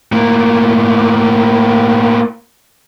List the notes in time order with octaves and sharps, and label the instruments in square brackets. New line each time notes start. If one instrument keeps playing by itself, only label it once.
[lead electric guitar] A2 A#3